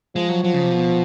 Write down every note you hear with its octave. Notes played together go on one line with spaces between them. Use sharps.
F3 G#3
F#3
F3 F#3
C#3
C3
B2